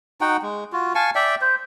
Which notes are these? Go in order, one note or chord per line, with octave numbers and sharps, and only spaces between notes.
D#4 F#4 F#5 G5
G#3
F4 F#4
F5 G#5 A5 C#6
D5 E5 G5
C5